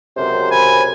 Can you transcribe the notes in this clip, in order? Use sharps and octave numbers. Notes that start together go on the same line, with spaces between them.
C#2 F#2 C3 C5
G#5 B5